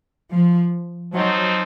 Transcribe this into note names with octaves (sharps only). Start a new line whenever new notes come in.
F3
F3 F#3 C4 D#4